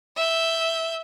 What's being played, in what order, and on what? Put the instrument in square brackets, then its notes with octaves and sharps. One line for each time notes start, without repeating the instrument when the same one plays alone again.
[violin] E5 G6